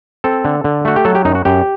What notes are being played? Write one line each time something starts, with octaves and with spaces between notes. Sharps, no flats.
C4 A4
D3
D3
A3 F#4
G4
F#3 A4
G4
F#2 D#4
F#4
F#2 G4